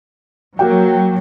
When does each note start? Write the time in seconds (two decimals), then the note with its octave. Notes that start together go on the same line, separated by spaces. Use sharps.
0.59 F#3 A#3 F#4 G5